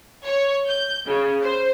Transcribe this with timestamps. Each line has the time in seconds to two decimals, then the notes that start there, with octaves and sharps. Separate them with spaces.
0.24 C#5
0.69 G6
1.07 C#3
1.43 C5